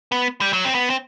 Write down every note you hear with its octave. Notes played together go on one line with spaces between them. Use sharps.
B3
G3
F#3
C4
B3
C4